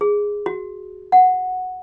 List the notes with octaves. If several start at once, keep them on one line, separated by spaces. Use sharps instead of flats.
G#4
F#4
F#5